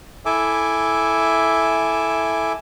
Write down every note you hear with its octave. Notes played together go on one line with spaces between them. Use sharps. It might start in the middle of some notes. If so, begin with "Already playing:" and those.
E4 A4 E5 G#5 D6